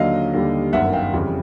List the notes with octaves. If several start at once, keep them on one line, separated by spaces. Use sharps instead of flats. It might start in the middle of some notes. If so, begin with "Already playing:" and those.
Already playing: D#2 D3 F#3 D#5 F5
D#2 D3 G3
G1 F#2 D#3 E5 F#5
F5 G5
F2 C#3 E3 G3